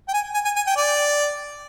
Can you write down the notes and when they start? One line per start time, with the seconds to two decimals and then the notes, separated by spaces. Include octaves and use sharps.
0.08 G5
0.14 G#5
0.34 G#5
0.45 G#5
0.56 G#5
0.67 G5
0.77 D5